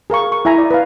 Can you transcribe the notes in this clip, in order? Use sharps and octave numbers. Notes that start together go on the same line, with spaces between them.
G#4 A#4 F5 C#6
C#6
E4 E5 G#5 A#5
D5
B4 F5